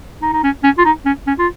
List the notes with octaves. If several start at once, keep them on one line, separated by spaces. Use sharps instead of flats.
D#4
D#4
C#4
C#4
F4
D#4
C#4
C#4
F4